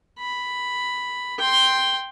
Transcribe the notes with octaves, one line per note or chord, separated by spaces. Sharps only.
B5
G5 C6